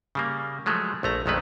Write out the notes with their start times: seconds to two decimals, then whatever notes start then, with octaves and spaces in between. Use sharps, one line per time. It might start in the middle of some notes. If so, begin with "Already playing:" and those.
0.15 C#3 G3 A#3
0.66 F3 F#3 G#3 A3
1.03 A#1 A3 A#5
1.26 A#1 F2 D#3 G#3 A3 B4